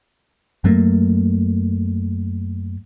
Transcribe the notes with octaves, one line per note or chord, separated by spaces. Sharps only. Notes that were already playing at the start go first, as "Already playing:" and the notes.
F#2 F#3 A3 A#3